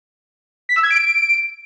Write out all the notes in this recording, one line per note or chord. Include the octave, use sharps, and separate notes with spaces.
B6
E6
G#6
D7